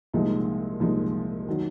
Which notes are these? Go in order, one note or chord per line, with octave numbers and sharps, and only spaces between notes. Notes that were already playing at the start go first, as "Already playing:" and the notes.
C2 A#2 F3 G#3 D#4
C2 A#2 F3 G#3 D#4
D#3 F#3